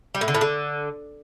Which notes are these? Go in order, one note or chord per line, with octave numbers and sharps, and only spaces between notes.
G3
A2
D3
A2
D3